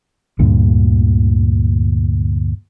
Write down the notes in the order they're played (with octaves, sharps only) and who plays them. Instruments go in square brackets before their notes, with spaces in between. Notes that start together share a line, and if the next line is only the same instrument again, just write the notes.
[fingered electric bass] D2 G2 A#2 D3